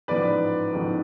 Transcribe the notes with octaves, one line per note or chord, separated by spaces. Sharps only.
A1 G#2 F3 B3 B4 D5
A1 G#2 F3 B3